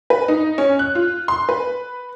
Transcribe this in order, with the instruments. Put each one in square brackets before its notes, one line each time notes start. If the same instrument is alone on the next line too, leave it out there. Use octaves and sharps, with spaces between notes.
[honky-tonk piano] B4
D#4
C#4
F#6
F4
C6
B4